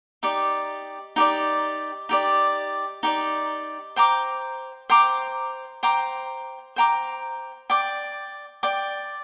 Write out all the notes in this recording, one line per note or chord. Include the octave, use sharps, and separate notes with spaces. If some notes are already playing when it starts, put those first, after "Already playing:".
D#4 G4 D5
D#4 G4 D5
D#4 G4 D5
D#4 G4 D5
C5 G5 A#5 D6
C5 G5 A#5 D6
C5 G5 A#5 D6
C5 G5 A#5 D6
D5 G5 D6
D5 G5 D6